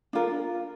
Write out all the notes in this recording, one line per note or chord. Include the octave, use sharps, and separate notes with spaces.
D4 F4 A#4